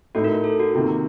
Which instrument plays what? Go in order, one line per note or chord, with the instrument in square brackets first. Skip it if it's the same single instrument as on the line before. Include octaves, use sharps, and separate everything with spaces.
[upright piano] A2 A3 D#4 [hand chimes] F#4
[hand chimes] A#4
A#4
A4
F#4
[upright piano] C3 D#3 A#3 [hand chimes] F4